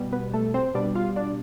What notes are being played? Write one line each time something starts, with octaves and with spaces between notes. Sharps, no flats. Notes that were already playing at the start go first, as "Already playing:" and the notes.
Already playing: B2 G3
B3 B4
A3 A4
C4 C5
B2 G3 B3 D4 D5
F4 F5
D4 D5